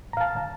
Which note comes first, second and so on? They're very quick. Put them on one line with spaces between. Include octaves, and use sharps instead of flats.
A#5 F5 A5